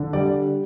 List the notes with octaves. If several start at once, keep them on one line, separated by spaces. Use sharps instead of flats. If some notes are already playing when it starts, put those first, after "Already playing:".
Already playing: D3
G3 D5